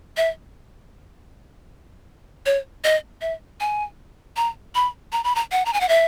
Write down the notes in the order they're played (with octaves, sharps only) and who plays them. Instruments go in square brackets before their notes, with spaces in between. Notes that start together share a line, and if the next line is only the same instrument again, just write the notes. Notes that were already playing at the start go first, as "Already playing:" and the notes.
[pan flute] E5
C#5
D#5
E5
G#5
A#5
B5
A#5
B5
A#5
F#5
A#5
G#5
F#5
E5